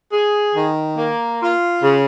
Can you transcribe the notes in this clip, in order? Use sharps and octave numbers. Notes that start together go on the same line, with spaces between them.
G#4
D#3
A#3
F4
C#3